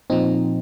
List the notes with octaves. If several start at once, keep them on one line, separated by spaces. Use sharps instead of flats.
A#2 F3 C4 D#4